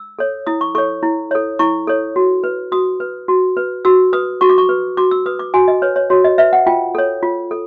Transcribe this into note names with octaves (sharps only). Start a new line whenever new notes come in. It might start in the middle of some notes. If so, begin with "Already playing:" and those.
Already playing: E6
A4 C#5
E4 D#6
C#6
A4 C#5 C#6
E4
A4 C#5
E4 C#6
A4 C#5
F#4
B4
F#4 D#6
B4
F#4
B4
F#4 E6
B4 D#6
F#4 C#6
D6
C#6
B4
F#4 D6
E6
B4 D#6
D6
F#4 G#5
D#5
B4 C#5
C#5
F#4 C#5
D#5
B4 E5
F#5
F4 G5
A4 C#5
F4
A4